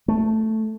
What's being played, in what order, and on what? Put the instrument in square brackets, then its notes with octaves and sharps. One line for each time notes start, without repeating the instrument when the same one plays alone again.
[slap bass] A3